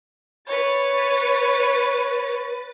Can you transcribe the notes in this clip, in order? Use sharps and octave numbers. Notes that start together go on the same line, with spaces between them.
B4 C#5 A6